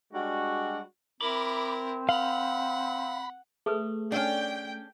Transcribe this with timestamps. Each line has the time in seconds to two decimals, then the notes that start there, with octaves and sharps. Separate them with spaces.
0.13 G3 G#3 D4 F#4
1.21 C4 E4 A#4 B5 D6
2.09 F5 F#5 B5
3.66 A3 G#4 A4 B4
4.12 C#4 D4 G5